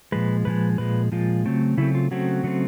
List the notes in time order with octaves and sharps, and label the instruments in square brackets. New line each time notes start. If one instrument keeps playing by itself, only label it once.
[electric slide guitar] A#2 F3 G#3 B4
A#2 F3 G#3 B4
A#2 F3 G#3 B4
A#2 F3 G#3 F4
C#3 F#3 A3 C4
C#3 F#3 A3 C4 E4
F4
C#3 F#3 A3 C4 F#4
C#3 F#3 A3 C4